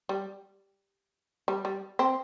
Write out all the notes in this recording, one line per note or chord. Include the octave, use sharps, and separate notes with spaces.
G3
G3
G3
C4